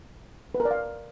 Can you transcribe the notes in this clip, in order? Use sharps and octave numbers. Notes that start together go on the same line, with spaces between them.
B4
A#4
D5
F5